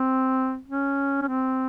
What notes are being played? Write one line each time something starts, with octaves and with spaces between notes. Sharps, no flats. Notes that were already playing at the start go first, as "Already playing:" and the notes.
Already playing: C4
C#4
C#4
C4